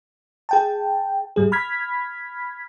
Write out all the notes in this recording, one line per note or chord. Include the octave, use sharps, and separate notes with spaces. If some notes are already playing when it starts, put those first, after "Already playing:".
G#4 G5 A5
G#2 G3 G#4
B5 F6 G#6 B6